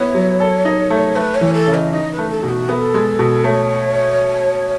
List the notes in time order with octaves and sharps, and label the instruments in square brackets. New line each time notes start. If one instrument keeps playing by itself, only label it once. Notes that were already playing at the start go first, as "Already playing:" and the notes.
Already playing: [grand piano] B3 E4 [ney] C#5
[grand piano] F#3
A4
D#4
A3
[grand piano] A3 [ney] B4
[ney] C#5
[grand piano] E3
[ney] A4
[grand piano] C#3
[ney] D#5
[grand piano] D#4 [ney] D#5
[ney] B4
[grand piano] A3
[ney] A4
[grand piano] B2
[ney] F#4
[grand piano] B3 [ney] A4
[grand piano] G#3
B2
[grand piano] A3 [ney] C#5